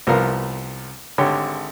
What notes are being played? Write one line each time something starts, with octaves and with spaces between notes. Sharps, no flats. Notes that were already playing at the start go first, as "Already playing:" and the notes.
C2 F3 B3 A#4 F5
G#1 D3 G4 C#5